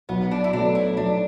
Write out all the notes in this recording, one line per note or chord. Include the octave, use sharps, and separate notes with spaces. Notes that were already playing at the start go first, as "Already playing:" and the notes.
B1 B3
D4
E4
B2 F#3 A3 D4
E4
B1 D4